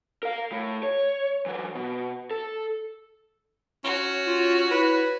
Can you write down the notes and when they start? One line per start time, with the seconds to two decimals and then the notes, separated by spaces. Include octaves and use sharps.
0.23 A#4 F5
0.52 A2
0.83 C#5
1.46 E3 F#3
1.75 B2
2.31 A4
3.84 C#4 F#4 C#5
4.27 F4
4.71 E4 B4